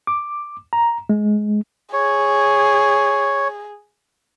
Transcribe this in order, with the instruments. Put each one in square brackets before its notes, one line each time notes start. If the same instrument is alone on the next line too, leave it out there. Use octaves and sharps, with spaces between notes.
[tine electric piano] D6
A#5
G#3
[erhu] G#4 [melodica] C#5